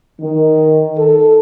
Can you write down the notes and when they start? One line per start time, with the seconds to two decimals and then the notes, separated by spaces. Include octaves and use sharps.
0.20 D#3
0.97 A4